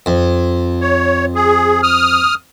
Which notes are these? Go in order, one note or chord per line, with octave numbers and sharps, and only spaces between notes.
F2
C#5
G#4
D#6 F6